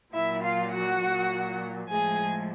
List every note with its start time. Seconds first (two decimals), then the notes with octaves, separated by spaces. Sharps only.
0.13 A#2 F#3 E4 E5
0.43 F4 F5
0.72 F#4 F#5
1.02 A#2 F#3
1.89 A2 F3 G#3 G#4 G#5